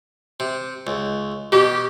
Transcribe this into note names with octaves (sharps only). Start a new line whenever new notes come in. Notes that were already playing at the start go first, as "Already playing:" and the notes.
C3
C#2
B2 G4